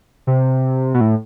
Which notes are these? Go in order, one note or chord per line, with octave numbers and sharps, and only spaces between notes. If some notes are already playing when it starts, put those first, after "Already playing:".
C3
B2
A2